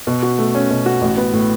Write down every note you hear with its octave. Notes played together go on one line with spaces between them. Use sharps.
B2
F#4
A3
C#4
B2
F#4
A1
B3
A2